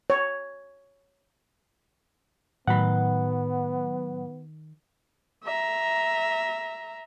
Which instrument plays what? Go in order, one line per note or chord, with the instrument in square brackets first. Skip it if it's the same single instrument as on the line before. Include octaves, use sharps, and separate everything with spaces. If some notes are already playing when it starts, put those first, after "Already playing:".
[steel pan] C#5
[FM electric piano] A2 F#3 [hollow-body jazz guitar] D#3 B5 [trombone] B3 [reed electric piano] F#5
[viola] E5 A#5